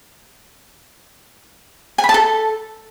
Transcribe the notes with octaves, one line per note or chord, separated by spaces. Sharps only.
G#5
B5
A5
A4